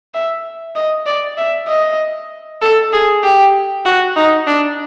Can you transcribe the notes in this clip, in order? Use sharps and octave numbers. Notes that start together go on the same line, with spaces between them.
E5
D#5
D5
E5
D#5
A4
G#4
G4
F#4
D#4
D4